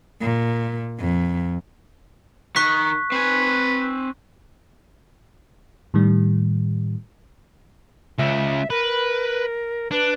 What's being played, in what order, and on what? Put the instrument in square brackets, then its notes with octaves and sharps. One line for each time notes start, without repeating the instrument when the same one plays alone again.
[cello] A#2
F2
[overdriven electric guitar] D#3 [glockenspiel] C#6 F#6 B6
[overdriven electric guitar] C4 G#5 [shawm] B4
[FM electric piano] A2 D#3 G3
[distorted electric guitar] C#2 C#3 [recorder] E5
[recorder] A#4 [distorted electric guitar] B4
[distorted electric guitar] D4 [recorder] B4